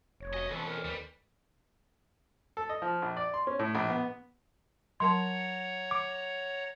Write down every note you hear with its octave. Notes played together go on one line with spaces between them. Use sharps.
F1 C#5
B1 C#4 F#4 D#5
F2 B2 E3 C#4 A4 B5
A#4
D#2 G3
A4
D#5
F3
A#1
D5
C6
C#4
A2
A#1
B3
F#3 A#4 C#5 F#5 A5 A#5 C6
D6